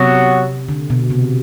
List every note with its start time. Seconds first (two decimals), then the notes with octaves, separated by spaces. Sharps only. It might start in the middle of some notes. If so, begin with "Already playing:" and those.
Already playing: C3 F#3 B3 F#4
0.69 D3
0.90 B2
1.10 C3